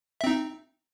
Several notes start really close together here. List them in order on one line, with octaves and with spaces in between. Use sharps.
E5 C4 D#4